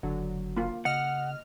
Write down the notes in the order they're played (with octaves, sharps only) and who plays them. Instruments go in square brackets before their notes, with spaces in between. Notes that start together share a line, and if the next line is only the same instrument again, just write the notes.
[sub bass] F#1 [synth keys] D3 F#3
[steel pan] A#3 F4
[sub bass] C#3 [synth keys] D#5 F6 [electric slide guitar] F#5